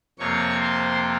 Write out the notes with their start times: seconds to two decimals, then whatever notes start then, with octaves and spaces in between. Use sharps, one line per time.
0.19 F2 C3 F3 A#3 C#5 C#6
0.61 C5 C6